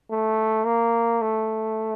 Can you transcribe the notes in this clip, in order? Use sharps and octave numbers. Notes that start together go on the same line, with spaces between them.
A3
A#3
A3